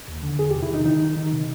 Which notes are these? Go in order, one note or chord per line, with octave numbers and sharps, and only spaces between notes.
D#2
D3
E2 G#4
G4
C3
E4
D#3 D#4
D#3 D#4
D#3
D#3
C3